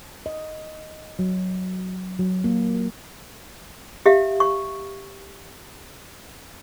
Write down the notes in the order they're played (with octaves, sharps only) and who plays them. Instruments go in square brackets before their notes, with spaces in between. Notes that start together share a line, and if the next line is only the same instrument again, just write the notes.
[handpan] D#5
F#3
F#3
A#3
[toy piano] G4 E5 F5
C#6